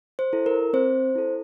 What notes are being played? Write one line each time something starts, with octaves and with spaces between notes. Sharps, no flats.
C5
E4 A4
A#4
C4 C5
E4 A4